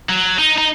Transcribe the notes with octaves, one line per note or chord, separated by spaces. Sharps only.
F#3
D#4
D#4